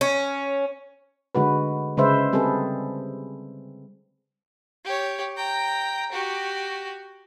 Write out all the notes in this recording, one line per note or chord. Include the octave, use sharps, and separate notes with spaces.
C#4
D3 G#3 F#4 B4
C#3 G#3 B4 C5 E5
G3 C4 G#4 A4 B4
G4 C#5
G5 A#5
F#4 G4